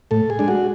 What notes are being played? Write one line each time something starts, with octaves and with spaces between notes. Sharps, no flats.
A2 A4
G#4
G#3 D4
F#4